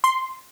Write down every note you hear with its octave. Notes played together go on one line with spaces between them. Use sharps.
C6